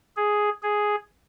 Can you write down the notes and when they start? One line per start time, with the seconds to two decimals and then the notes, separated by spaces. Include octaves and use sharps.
0.16 G#4
0.62 G#4